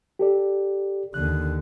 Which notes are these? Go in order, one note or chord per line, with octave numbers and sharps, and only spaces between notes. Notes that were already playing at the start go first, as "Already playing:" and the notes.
G4 A4 D5
D#2 D3 F#6